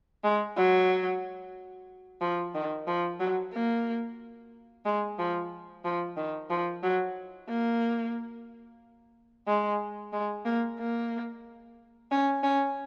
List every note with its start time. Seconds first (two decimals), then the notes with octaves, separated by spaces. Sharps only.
0.24 G#3
0.56 F#3
2.21 F3
2.55 D#3
2.87 F3
3.20 F#3
3.53 A#3
4.85 G#3
5.19 F3
5.84 F3
6.17 D#3
6.50 F3
6.83 F#3
7.49 A#3
9.47 G#3
10.13 G#3
10.45 A#3
10.79 A#3
12.11 C#4
12.43 C#4